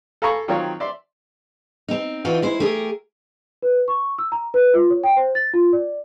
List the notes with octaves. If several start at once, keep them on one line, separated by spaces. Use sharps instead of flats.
A4 F5 G#5 A#5 B5 C#6
D#3 F#3 C4 F4 A#4 C#5
D5 E5 C6
C4 D#4
E3 C4 D#4 F4 F#4
G#3 E4 C5
A3 G4 G#4 A#4
B4
C#6
E6
A#5
B4
F4
C#5
G5
C5
A6
F4
D5